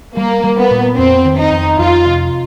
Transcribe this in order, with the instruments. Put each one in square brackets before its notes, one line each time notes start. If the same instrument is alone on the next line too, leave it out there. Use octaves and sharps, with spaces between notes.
[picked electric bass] G3 [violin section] A#3
[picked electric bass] G3
[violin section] B3
[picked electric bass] A#2
[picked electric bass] F2 [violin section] C4
[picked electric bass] D#3
[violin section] D#4
[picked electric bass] F2
[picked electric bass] F2 [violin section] F4
[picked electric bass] C3